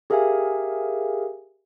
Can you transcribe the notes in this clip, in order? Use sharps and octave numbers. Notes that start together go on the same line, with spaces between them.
G4 G#4 A#4 E5 F5 G#5